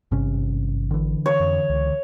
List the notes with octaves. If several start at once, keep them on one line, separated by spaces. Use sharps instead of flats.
G#1 G2 C3 C#4
D3 E3
C#5
F2
C#2